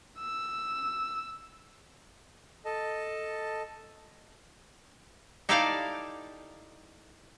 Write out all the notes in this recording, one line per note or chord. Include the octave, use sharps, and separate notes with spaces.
E6
A4 D#5 A5
D#4 E4 G4 A4 D5 F5